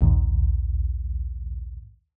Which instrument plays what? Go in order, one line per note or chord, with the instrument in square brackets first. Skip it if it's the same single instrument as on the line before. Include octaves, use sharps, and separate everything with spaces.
[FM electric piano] A#1 D#2 G#2